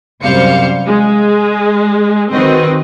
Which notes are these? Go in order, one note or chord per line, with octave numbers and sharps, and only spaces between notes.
F#2 C3 G3 C5 F5 C#7
G#3
D#3 C4 F#4 B4 D#5